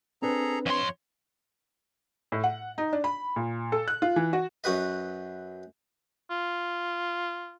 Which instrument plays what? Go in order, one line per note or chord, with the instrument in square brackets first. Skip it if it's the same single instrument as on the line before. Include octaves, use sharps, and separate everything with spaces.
[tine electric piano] C4 D4 B4 [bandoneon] G#4 A4 A#5
[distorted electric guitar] F2 C6 [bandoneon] C#5
[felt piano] A2
F#5
D#4
D4
B5
A#2
A4
F#6
F4
E3
F#4
[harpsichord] F#2 F#4 B4 D#5
[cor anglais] F4